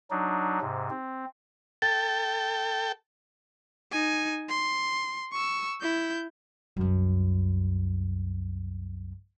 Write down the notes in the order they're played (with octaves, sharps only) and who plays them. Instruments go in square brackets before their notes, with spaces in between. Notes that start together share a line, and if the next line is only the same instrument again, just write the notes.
[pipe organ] F#3 D4 D#4
G#2 C3
C4
[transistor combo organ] A4 G5 [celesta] A6
[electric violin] D#4 G#5
C6
C#6 E6
E4 G6
[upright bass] C2 F#2